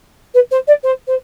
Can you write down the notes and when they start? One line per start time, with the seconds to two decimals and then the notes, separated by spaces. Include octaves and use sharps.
0.34 B4
0.51 C5
0.67 D5
0.83 C5
1.07 C5